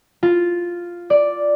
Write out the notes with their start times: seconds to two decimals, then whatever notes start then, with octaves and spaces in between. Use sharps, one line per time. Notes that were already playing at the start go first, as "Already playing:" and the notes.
0.23 F4
1.10 D5